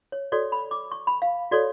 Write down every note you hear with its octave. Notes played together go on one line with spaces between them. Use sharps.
C#5
F#4 A4 C#5 D5
B5
D6
C#6
B5
F5
F#4 A4 C#5 D5